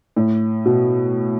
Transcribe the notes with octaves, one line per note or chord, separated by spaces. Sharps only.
A2
B2